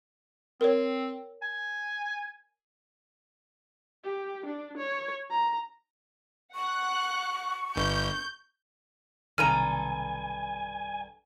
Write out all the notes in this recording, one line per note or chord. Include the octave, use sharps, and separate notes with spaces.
C4 A#4 C#5
G#5
G4
D4
C#5
A#5
F#5 C#6 F#6
G1 G6
B1 G2 C3 D#3 A4 G#5 A#5 F6